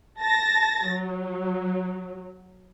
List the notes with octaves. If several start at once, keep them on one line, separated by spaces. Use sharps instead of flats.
A5 A6 A#6
F#3